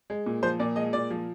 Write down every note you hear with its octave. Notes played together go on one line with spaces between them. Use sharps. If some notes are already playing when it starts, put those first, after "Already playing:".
G#3
A#2
F3 C5
A#2 D5
G#3 D#5
A#2 D5
F3